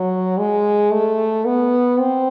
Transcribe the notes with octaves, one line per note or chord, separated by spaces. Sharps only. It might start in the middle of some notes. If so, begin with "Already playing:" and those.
Already playing: F#3
G#3
A3
B3
C4